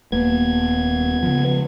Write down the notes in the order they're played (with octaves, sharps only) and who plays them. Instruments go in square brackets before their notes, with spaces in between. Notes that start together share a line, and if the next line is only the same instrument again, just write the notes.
[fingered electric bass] D#1 A#3 [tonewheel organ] B3 G#6
[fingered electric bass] C#3 F3